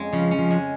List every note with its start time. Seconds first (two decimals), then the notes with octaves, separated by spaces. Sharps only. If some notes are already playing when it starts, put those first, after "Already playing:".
Already playing: F2 G#3 C#4
0.13 C#3 F3
0.31 C#4
0.39 F3
0.51 G#3